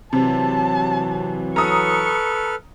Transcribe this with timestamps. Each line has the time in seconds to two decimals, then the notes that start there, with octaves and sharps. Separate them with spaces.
0.13 C3 E3 F#3 A5
1.56 A4 B4 A#5 C#6 D#6 F6